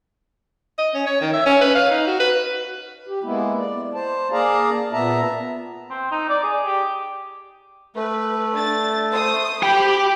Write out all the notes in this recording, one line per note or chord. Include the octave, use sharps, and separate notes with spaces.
D#5
C#4
C#5
D#3
E5
C#4
B4
F5
D#4
F#4
B4
G4
G#3 A#3 B3 E4
D5
C5 A5
A#3 G#4 D5 F5 A5 A#5
A#2 B3 E5 A5 A#5
C4
D#4
D5
G#4
G4
A3 B4
D4 A6
C5 D#6
G4 G5 B5